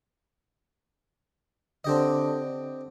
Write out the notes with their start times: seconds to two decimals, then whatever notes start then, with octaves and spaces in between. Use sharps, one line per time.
1.84 D3 C4 G4 D#5